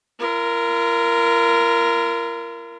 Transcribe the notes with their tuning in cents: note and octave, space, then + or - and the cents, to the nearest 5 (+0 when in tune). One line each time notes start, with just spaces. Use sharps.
F4 -45 A#4 +0